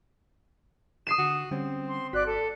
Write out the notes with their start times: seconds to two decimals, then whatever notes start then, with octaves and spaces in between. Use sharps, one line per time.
1.07 D#6 C7 E7
1.18 D3 F#4
1.51 D3 G3 C4 C#4
1.88 C6
2.13 G1 F#4 D5 F#6 B6
2.26 A4